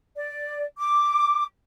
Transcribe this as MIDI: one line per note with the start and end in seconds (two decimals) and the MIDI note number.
0.16 0.65 74
0.79 1.44 86